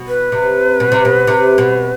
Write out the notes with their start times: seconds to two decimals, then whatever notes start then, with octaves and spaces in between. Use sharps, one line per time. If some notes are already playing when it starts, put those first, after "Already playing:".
Already playing: B2
0.08 B4
0.32 C3
0.80 B2
0.92 C3
1.05 B2
1.27 C3
1.58 B2